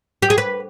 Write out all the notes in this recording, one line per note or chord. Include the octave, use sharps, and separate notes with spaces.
G4
G#4
B4